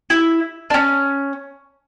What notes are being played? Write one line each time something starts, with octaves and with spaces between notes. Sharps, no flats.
E4
D4
C#4